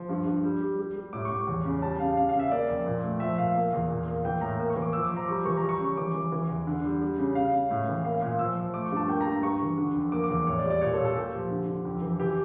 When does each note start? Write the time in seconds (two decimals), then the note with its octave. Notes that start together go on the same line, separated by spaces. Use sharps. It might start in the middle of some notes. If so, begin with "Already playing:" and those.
Already playing: F3
0.09 G2
0.26 G2
0.44 G3
0.61 G3
0.79 G3
0.96 G3
1.13 A2 D6
1.25 C#6
1.30 A2
1.47 E2
1.65 C#3
1.82 G3 A5
2.00 C#3 F5
2.16 C#3 F5
2.29 F5
2.35 C#3 E5
2.51 A#3 D5
2.69 F2
2.86 A#2
3.03 A3
3.20 F3 E5
3.38 A#2 F5
3.55 A#3
3.73 E2
3.90 A#2
4.08 A#3
4.25 E3 G5
4.41 A2 A#5
4.59 A#3
4.70 C#6
4.76 E3
4.82 D6
4.93 F3 E6
5.05 D6
5.11 F3
5.17 A#5
5.28 G3 C#6
5.45 E3 C#6
5.57 A#5
5.63 G3
5.69 C#6
5.80 C#3
5.97 E3 D6
6.14 E3
6.32 E3
6.49 E2
6.67 D3
6.84 G3
7.01 G3
7.18 C#3
7.35 C#3 F5
7.52 C#3
7.70 A2
7.88 E3
8.04 A#3 F5
8.22 A#2 F5
8.39 F3 E6
8.56 F3
8.74 A3 D6
8.85 C#6
8.91 G2
8.96 A5
9.09 A#3 G5
9.21 A#5
9.26 G2
9.32 A#5
9.43 G2 C#6
9.61 E3
9.78 D3
9.94 F2
10.12 A#3 D6
10.24 D6
10.30 E2
10.47 A2 C#5
10.59 D5
10.64 G3
10.70 D5
10.81 A#2 C#5
10.94 A4
10.99 A#2
11.05 A4
11.15 A#2 G4
11.33 F3
11.51 D3
11.68 D3
11.85 F2
12.02 E3
12.20 E3 G4